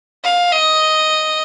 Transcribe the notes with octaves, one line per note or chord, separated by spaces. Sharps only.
F5
D#5